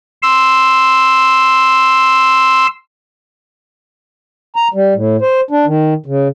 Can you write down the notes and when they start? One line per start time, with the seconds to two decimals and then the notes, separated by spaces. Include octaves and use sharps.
0.23 C6 E6
4.56 A#5
4.74 G3
4.95 A2
5.21 C5
5.50 D4
5.66 D#3
6.06 C#3